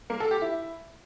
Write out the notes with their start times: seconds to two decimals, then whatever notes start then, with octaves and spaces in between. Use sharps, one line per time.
0.10 A#3
0.20 A4
0.31 G4
0.42 E4